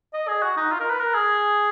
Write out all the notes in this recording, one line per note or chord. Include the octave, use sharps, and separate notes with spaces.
D#5
G#4
F#4
D#4
F4
A#4
B4
A#4
G#4